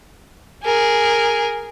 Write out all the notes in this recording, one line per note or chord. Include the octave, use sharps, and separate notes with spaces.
G#4 A#4